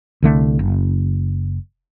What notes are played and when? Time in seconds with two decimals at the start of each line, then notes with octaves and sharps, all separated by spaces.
0.23 C2 D3 A3
0.59 F#1